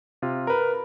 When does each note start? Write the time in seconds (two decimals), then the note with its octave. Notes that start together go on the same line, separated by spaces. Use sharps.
0.22 C3 F4
0.47 A#4 B4